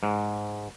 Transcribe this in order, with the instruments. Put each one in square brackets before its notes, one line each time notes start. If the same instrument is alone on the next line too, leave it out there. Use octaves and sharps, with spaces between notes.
[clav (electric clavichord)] G#2